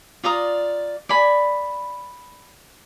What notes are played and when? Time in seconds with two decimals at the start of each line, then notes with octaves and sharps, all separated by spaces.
0.24 F4 D5 A#5 D#6
1.09 D5 G#5 B5